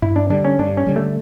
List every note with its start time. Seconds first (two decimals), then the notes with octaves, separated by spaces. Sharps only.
0.02 G2 E4
0.16 D4
0.30 D3 G3 D4
0.45 C#4
0.59 G2 D4
0.77 C#4
0.87 D3 G3
0.96 A3